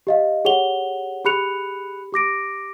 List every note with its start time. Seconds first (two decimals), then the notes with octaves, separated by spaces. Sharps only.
0.07 G4 D#5 F5
0.45 G4 G#4 C#5 F#5 F7 G7
1.25 G4 G#4 B5 F#6 C#7 F7
2.13 G4 D6 A#6 D7